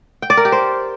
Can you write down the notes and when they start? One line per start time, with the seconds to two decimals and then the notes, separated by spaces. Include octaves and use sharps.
0.22 G5
0.30 D5
0.37 A#4
0.45 G4
0.52 C5